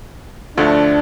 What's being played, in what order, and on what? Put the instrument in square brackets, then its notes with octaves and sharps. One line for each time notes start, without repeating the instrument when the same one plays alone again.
[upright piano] D2 D3 F3 A3 [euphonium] D4